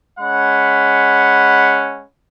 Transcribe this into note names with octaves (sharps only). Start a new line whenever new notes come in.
G#3 C#4 F#5 B5